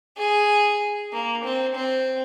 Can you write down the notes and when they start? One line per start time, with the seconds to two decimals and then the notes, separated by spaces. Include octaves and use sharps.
0.18 G#4
1.13 A#3
1.44 C4
1.76 C4